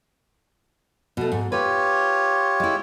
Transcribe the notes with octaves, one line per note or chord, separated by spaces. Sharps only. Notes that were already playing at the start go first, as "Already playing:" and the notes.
B2 A3
G#2
F4 G4 B4 C#5
G#3 E4